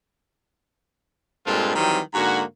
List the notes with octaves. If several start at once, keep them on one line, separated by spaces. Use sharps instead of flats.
G2 A#2 G#3 C4 F4 A4
D#3 E3 F#3 G3 C4
G#2 D3 A#3 F#4